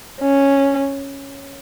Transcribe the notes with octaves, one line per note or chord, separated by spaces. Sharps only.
C#4